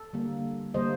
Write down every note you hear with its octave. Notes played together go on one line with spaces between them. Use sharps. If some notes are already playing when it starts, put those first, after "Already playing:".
Already playing: A4
D3 G3 A#3
D3 G3 A#3 C5 D#5